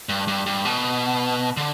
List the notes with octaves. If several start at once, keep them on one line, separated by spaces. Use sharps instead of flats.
G2
G2
G2
B2
D3